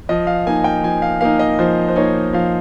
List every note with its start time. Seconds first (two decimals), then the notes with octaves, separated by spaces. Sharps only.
0.09 F3 D#5
0.27 F5
0.46 A#3 D#4 G#5
0.64 G5
0.83 F3 G#5
1.02 F5
1.21 A#3 D#4 F5
1.39 D#5
1.59 F3 C5
1.88 C5
1.96 A#3 D#4 C#5
2.33 F3 F5